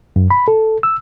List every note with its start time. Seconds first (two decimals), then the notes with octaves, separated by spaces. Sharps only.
0.16 F#2
0.31 B5
0.48 A4
0.83 E6